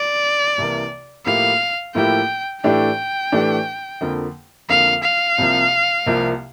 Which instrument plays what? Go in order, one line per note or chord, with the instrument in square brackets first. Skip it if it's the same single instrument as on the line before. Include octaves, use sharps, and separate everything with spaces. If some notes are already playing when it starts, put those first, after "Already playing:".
Already playing: [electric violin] D5
[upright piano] C2 C3 E3 A#3
[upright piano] A2 F3 A#3 E4 G4 [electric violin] F5
[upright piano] A2 F3 A#3 E4 G4 [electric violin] G5
[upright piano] A2 E3 A3 D4 G4 [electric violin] G5
[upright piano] A2 E3 A3 D4 G4
F2 D3 F3 A#3
[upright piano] F2 D3 F3 A#3 [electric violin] F5
[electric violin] F5
[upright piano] C2 C3 F3 A#3
C2 C3 F3 A#3